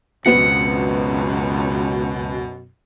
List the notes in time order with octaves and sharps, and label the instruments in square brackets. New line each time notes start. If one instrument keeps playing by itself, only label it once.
[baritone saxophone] C#2 [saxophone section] F#2 B2 [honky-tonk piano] F#3 B3 C4 [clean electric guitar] F#5